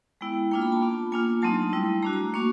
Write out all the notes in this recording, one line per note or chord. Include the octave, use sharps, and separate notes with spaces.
G#3 B3 E4 G5
A#3 D4 F4 G5
B5
A5
B3 D4 F4
A#3 D4 F4 G#5
F#3 A3 C4 D#4 A5
G3 C4 E4
A3 D4 F#4 A#5
A#5
A#3 D4 F#4 C#6